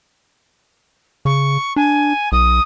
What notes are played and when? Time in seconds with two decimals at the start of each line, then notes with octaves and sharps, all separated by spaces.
1.25 C#3 C#6
1.76 D4 G#5
2.32 B1 D#6